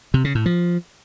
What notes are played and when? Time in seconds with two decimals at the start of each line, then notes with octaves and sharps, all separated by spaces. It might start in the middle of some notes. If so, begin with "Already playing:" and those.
0.14 C3
0.24 C#3
0.35 A2
0.46 F3